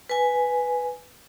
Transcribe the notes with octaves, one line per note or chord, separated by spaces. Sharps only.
B4 G#5